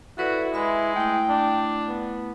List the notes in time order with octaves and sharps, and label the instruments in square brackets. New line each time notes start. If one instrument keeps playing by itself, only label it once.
[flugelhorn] E4 [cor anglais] F#4 [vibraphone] A4 B4 D5
[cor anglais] G#3 [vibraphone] B4 E5 B5
[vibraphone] A3 E4 [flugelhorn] G5
[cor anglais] D4
[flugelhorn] B3